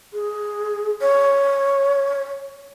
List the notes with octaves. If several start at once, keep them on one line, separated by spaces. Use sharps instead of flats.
G#4
C#5